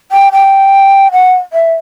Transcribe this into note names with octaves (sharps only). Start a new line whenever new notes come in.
G5
G5
F#5
E5